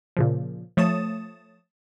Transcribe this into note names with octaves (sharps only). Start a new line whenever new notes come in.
A#2 C#3 F3
F3 A3 C#5 D#6 A6 E7